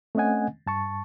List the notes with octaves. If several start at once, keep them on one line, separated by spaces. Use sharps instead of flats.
A3 C4 C#4 D#5 F#5 G#5
G2 A5 C#6